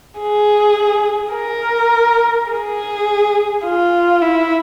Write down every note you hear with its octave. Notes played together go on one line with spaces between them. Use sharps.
G#4
A#4
G#4
F4
E4